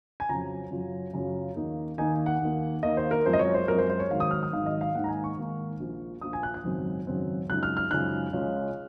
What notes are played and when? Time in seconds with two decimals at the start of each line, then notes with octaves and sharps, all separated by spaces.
0.20 G#5
0.29 F2 C#3 F#3 C#4 A#5
0.71 F#2 C#3 F#3 C#4 F4
1.13 F#2 C#3 F#3 C#4 F4
1.56 D#2 D#3 A#3 D#4
1.98 D#2 D#3 A#3 D#4 G#5
2.26 F#5
2.42 D#2 D#3 A#3
2.83 D#2 D#3 A#3 D#5
2.97 C5
3.11 A#4
3.26 F#2 F3 G#3 C4 C5
3.33 D#5
3.39 C#5
3.54 C5
3.67 F#2 F3 G#3 C4 A#4
3.78 C5
3.90 C5
3.99 C#5
4.10 G#1 G#2 D#3 F#3 F5
4.20 D#6
4.31 F6
4.43 D#6
4.53 G#1 G#2 D#3 F#3 F5
4.66 D#5
4.81 F5
4.94 G#2 D#3 A#3 F#5
5.04 A#5
5.09 G#5
5.24 C#6
5.37 G#2 D#3 A#3
5.80 A#1 A#2 F3
6.21 A#1 A#2 F3 D#6
6.33 G#5
6.43 F#6
6.54 F#6
6.64 G#1 F#2 C#3 F#3 C4
7.07 G#1 F#2 C#3 F#3 C4
7.49 F#2 C#3 F3 G#3 D#4 F#6
7.63 F6
7.77 F6
7.91 F#2 C#3 F3 G#3 D#4 F#6
8.33 C#2 C#3 G#3 C#4 F4